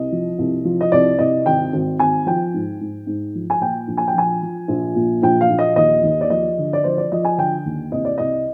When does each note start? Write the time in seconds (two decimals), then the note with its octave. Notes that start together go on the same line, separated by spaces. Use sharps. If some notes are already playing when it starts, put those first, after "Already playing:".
Already playing: C2 D#5
0.12 F3
0.39 C2
0.65 F3
0.81 D#5
0.92 C2 D5
1.19 C2 D#5
1.46 G#1 G5
1.73 G#1
1.99 G#1 G#5
2.26 F3 G5
2.54 G#2
2.81 G#2
3.07 G#2
3.35 F3
3.50 G#5
3.61 A#2 G5
3.88 A#1
3.97 G#5
4.07 G5
4.14 F3 G#5
4.42 F3
4.68 A#1
4.95 A#2
5.22 A#1 G5
5.41 F5
5.50 A#1
5.59 D#5
5.76 D#2 D#5
6.03 D#2
6.21 D5
6.30 F3 D#5
6.58 D3
6.73 D5
6.84 F3 C5
6.98 D5
7.12 F3 D#5
7.25 G#5
7.38 D3 G5
7.65 D#2
7.91 C2 D#5
8.05 D5
8.18 C2 D#5